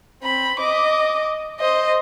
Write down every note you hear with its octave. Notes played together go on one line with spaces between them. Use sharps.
C4 B5
D#5 D6
C5 D#5